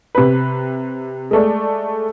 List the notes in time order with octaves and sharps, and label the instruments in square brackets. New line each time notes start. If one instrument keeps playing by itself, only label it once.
[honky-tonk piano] C3 B4
G#3 A3 D5